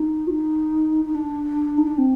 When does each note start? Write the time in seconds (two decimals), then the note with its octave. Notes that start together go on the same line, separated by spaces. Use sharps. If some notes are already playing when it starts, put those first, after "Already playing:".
Already playing: D#4
0.27 F#4
0.31 D#4
1.05 D#4
1.15 D4
1.77 D#4
1.87 D4
1.98 C4